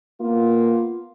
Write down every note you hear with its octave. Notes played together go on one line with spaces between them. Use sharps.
A#3 B3 F4